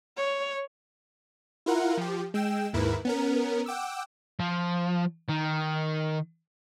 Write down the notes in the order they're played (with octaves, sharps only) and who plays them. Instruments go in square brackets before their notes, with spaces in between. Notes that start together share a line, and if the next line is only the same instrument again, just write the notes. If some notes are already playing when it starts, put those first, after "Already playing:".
[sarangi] C#5
[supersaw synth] E4 F4 A#4 F#5
F3 G4
G#3 G5 E6 E7
D#2 G#2 E4 A#4 B4
B3 C#4 A#4
F#5 G5 D6 E6
[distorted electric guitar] F3
D#3